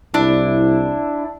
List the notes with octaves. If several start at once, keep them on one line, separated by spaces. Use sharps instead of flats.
C2 D4 E4